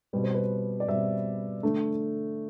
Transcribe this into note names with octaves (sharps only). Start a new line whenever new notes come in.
B2 G3 C4 B4
C5
B4
D5
B2 G3 C4 E5
D3 A3 D4